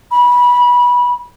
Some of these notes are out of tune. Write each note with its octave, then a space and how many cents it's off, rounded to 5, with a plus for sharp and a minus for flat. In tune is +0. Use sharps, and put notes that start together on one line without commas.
B5 -20